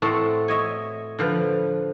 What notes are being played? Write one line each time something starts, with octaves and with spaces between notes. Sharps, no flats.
A2 A3 C4 F#4 A5 C6
C#5 D#5 E5
D3 F3 B4